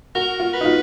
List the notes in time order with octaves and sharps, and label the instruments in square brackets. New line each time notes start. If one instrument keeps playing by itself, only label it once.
[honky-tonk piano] F#4 [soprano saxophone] A#4
[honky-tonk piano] F4
[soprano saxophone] B4
[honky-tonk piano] D#4
F4